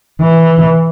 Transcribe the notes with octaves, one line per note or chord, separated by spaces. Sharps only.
E3